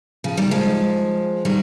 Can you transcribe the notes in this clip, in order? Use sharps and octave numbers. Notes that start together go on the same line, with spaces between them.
C#3 F3
D#3 G3
F3 G#3
D#3 G3